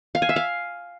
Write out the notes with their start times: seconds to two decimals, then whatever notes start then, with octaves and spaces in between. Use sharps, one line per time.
0.15 F5
0.22 G#5
0.29 E5
0.36 F5